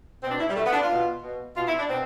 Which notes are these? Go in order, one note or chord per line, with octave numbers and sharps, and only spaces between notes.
B2 C4
D4
E4
G3
B2 A3
B3
D4
F4
B2
B2
B2 F4
E4
D4
B2 C4